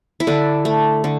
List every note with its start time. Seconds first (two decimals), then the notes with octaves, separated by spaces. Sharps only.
0.20 E4
0.27 D3 D4
0.65 A3
1.04 D3